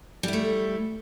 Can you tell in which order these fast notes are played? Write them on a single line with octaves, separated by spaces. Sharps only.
G3 E4 A3